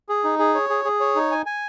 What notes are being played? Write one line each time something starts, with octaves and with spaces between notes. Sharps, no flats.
G#4
D#4
G#4
C#5
G#4
G#4
C#5
D#4
G#5
G#5